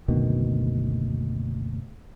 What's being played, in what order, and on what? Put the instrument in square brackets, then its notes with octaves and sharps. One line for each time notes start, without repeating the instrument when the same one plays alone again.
[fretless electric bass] F#1 D2 B2 D#3